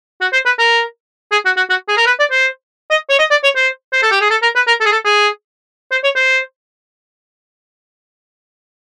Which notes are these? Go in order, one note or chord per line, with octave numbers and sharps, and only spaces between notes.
F#4
C5
B4
A#4
G#4
F#4
F#4
F#4
G#4
A#4
B4
D5
C5
D#5
C#5
D#5
D5
C#5
C5
C5
A4
G4
G#4
A4
A#4
B4
A#4
A4
G#4
A4
G#4
C5
C#5
C5